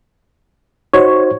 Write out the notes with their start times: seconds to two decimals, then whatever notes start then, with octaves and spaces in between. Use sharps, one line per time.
0.93 D#4 F#4 C5 C#5